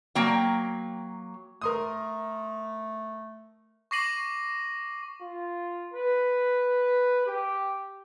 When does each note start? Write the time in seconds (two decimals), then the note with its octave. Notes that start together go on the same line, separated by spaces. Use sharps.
0.15 F#3 A#3 G5
1.62 A3 A#4 C6 D#6
3.91 C#6 D6 A#6 C7 D#7 F#7
5.22 F4
5.93 B4
7.27 G4